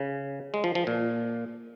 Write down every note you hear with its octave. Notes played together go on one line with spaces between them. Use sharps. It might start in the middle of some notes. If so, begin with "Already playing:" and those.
Already playing: C#3
G#3
F3
F3
A#2